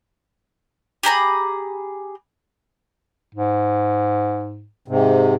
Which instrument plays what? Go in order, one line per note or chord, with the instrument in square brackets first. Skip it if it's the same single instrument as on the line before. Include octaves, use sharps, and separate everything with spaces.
[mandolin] G4 G#4 A#5 B5
[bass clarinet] G#2
[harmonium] G#2 C3